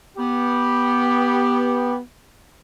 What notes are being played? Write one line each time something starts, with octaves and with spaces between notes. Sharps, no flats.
B3 G4